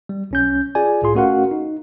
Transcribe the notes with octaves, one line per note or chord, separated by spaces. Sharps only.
G3
B1 C#4 G6
F4 G#4 D5 G#5
C2 A2 F4 G#4 C6
A3 C#4 F#4 A#4 F5 F#5
D#4